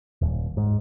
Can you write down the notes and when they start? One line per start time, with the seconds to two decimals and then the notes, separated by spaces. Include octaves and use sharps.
0.22 D#1
0.57 G#2